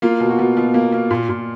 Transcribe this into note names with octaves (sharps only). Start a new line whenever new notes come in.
A#3 F4
B2
F#4
B2
B2 F4
A#3
A#3
A#2
A#2